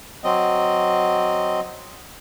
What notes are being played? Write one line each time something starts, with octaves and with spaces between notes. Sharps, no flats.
F#3 C4 D#5